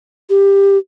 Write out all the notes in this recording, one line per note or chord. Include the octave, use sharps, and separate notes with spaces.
G4